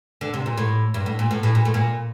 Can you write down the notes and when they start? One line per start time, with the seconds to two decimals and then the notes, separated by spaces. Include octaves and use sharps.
0.21 D3
0.34 C3
0.46 A#2
0.57 A2
0.94 G2
1.06 A2
1.19 A#2
1.31 A2
1.43 A2
1.55 A#2
1.65 A2
1.74 A#2